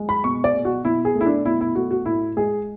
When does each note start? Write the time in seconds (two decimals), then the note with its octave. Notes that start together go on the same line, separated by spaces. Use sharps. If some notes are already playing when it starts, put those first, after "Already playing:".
Already playing: G#3
0.09 B5
0.24 B2 C#6
0.44 D5
0.54 B2
0.65 F#4
0.84 B2 E4
1.05 G#4
1.15 A3
1.21 E4
1.26 D4
1.45 B2 E4
1.61 E4
1.75 A3 F#4
1.91 F#4
2.06 A2 E4
2.37 G#3 G#4